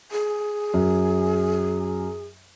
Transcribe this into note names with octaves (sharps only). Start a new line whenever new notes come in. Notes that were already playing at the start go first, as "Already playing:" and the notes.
G#4
F#2